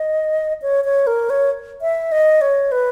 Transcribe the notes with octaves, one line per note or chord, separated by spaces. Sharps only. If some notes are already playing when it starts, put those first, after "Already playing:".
Already playing: D#5
C#5
C#5
A#4
C#5
E5
D#5
C#5
B4